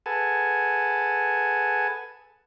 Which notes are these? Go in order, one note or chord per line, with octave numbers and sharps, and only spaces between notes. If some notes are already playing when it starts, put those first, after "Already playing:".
G#4 A4 B4 F#5 G#5 A5